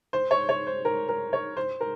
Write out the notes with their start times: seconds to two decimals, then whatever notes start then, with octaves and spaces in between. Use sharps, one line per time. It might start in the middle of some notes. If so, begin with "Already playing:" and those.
0.13 C5
0.31 C#5
0.49 C#5
0.67 C5
0.85 A#4
1.09 A#4
1.33 C#5
1.57 C5
1.81 A#4